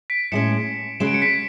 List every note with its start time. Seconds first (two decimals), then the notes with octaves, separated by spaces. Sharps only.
0.10 B6 D7
0.32 A2 G#3 C#4 C#7 E7
1.00 C#3 G#3 C#4 F#4 E7
1.07 D7
1.14 C#7
1.22 B6 D7